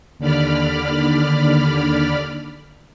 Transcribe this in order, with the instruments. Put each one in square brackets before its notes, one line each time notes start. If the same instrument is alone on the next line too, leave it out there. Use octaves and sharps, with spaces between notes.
[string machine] D#2 D3 D5 B5 F6